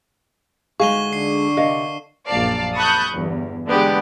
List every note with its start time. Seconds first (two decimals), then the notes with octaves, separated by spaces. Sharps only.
0.80 D2 G#3 D#4 G#4 F5 C#6 D#7 G7
1.13 D3 D4 C7
1.57 C3 A#4 D#5 F5
2.27 A#1 F#2 D5 F5 A5
2.75 A5 B5 C#6 D#6 F#6 G6
3.14 G1 E2
3.67 D3 G#3 B3 G4